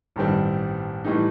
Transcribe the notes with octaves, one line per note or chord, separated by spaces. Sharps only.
A1 G2 D#3 G3 C4
A2 E3 G3 D#4